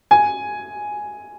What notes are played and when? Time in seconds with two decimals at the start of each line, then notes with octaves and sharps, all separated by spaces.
0.11 G#5